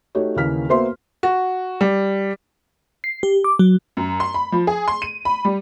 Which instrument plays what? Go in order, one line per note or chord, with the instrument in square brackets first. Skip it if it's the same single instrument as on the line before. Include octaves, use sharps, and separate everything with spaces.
[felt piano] A3 D#4 F#4 G4 C#5
D#2 C#3 E3 A#3 F6 B6
A#3 B3 F#4 C5 E5 C6
F#4
G3
[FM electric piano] C7
G4
D6
F#3
[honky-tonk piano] F#2
C6
B5
F3
G#4
C6
D#7
B5
G3